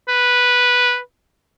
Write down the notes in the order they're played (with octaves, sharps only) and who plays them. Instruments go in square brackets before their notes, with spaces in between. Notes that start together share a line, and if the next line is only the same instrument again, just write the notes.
[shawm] B4